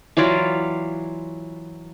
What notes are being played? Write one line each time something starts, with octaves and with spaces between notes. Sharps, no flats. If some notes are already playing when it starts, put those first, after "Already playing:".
E3 F#3 F4 D5